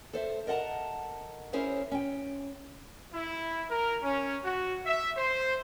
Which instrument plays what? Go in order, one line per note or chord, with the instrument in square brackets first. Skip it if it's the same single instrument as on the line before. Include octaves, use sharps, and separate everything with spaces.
[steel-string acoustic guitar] A4 C5 D#5 E5
A#4 D#5 F#5 A5 A#5
C#4 E4 G#4 A#4 C5 C#5
C#4 G5
[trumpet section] E4
A#4
C#4
F#4
E5
C5